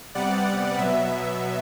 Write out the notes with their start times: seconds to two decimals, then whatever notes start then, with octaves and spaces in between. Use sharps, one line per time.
0.15 C3 G3 B3 D5 F#5
0.78 B2 F#3 B3 E5